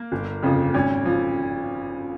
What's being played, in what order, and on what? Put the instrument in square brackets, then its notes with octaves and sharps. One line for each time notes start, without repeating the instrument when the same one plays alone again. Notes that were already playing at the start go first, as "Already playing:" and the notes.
Already playing: [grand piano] A#3
[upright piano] G1
F2 C#3 F3
[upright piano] G#1 [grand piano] C#4
[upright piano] F3